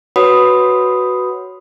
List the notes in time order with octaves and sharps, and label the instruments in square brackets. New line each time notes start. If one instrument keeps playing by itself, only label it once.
[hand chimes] F#4 B4 C#5 F#5 B5 D#6